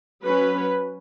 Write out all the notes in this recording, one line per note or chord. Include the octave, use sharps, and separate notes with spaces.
F#3 C#4 B4